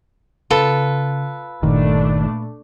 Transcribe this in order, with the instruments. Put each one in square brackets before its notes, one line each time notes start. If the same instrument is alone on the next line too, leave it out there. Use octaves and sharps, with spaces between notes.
[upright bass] C#3 [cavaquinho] F4 A4 B4
[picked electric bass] G1 D#3 [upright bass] A#2 [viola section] A3 D4